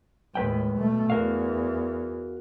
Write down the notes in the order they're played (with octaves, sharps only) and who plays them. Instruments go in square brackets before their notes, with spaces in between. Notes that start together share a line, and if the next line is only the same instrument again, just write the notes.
[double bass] D#2 A2 [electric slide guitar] G#3 B4 G5
[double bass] B2 A3
[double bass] E2 [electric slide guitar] F#4 A#4 F5